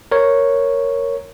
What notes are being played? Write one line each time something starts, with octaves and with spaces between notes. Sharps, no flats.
A#4 C#5